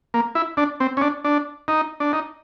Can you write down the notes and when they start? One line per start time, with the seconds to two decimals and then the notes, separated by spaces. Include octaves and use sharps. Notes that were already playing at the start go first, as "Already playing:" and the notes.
0.14 A#3
0.35 E4
0.57 D4
0.80 C4
0.97 C#4
1.02 D4
1.24 D4
1.68 D#4
2.00 D4
2.13 D#4